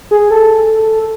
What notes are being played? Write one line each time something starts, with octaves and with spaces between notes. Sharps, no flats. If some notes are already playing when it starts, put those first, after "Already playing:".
G#4
A4